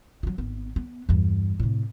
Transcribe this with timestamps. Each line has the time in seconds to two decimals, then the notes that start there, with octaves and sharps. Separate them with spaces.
0.23 F3 F#3
0.38 G#1 B3
0.76 B3
1.09 E2 G2
1.60 A2 C3